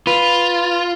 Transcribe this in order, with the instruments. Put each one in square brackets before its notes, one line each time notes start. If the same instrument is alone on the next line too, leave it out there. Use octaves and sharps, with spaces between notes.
[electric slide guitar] F4 [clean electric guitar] B4